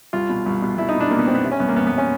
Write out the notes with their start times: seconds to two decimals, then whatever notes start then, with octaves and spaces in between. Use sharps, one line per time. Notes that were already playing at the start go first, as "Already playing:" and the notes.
0.13 C2 F4
0.29 B2
0.46 C2
0.62 B2
0.78 C2 E4
0.89 D#4
0.95 B2
1.00 D4
1.11 B2 A#3
1.19 B3
1.27 B2 C4
1.35 B3
1.44 C3
1.52 C#4
1.60 C2 B3
1.68 A#3
1.76 C2 B3
1.87 B3
1.92 C2
1.98 C#4